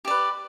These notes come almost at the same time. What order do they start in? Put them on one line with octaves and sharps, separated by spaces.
G4 D5 B4